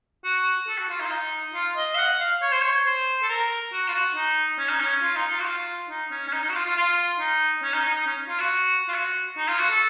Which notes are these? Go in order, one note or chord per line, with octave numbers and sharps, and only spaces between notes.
F#4
A4
F#4
F4
D#4
F4
D#4
F4
D#5
F5
F#5
F5
C#5
C5
C#5
C5
A4
A#4
F#4
F4
F#4
D#4
C#4
D#4
C#4
F4
D#4
F4
F#4
F4
D#4
C#4
C#4
D#4
D#4
F#4
F4
F4
F4
D#4
C#4
D#4
D#4
D#4
C#4
F4
F#4
F4
F#4
D#4
F4
F#4
A4